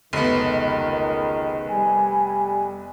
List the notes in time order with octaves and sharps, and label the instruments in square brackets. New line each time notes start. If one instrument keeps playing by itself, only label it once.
[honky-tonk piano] F1 B3 [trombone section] C#2 [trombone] D#3
[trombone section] G3 [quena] G#5